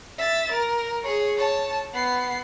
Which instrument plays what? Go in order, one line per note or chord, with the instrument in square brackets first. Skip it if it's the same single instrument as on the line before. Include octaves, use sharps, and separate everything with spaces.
[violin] E5 A6
A#4
G#4 C#5
C#5 A5
B3 C7